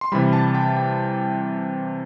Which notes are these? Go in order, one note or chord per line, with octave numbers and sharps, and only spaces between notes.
C6
C3 E3 G3 B5
A5
G5
G5